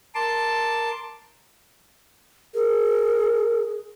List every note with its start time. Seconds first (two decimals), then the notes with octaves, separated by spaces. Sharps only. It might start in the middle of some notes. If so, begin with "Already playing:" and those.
0.15 A#4 A5 C6 D6
2.54 G#4 A#4